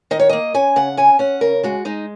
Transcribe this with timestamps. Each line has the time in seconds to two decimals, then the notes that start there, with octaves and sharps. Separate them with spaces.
0.11 D#3 D#5
0.20 C#5
0.29 A#3 D#5
0.54 C#4 G#5
0.76 C#3 F#5
0.97 C#4 G#5
1.19 C#4 F#5
1.41 C#3 A#4
1.63 G#3 F#4
1.85 G#3 D#4